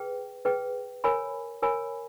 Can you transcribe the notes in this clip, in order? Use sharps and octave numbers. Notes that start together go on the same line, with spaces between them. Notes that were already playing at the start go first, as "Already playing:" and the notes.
Already playing: G#4 B4 G5
G#4 B4 G5
A#4 C#5 G#5 B5
A#4 C#5 G#5 B5